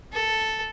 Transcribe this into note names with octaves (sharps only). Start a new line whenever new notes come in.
A4